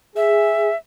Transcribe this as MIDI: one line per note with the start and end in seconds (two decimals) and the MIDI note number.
0.16 0.68 68
0.16 0.76 76